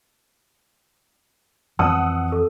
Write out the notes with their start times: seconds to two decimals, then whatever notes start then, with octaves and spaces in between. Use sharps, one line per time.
1.79 F2 E3 F#5 A5 D#6 E6
2.32 A4